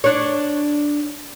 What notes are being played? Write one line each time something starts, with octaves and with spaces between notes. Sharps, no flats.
D4 C#5